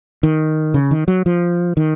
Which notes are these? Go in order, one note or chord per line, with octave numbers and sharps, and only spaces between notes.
D#3
C#3
D#3
F#3
F3
D#3